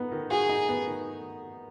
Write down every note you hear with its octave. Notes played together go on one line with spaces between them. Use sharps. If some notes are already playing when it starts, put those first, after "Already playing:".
Already playing: B3 D#4
D#3
F#4 G#4
D#4
B3
D#3